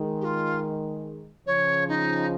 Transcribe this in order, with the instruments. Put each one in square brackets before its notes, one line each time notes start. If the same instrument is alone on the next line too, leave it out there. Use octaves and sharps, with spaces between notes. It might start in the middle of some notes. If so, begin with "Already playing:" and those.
Already playing: [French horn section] D#3 G#3
[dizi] G4
F4
[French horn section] C#3 F3 [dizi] C#5
[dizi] D#4